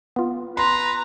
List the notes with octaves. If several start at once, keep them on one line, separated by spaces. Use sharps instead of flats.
B3 F4
B4 A#5 C6